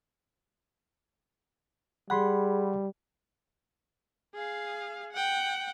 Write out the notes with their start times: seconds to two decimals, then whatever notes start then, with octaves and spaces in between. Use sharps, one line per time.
2.10 G3 G#4 F#5 B5 C6
4.35 G#4 F5
5.13 F#5 G5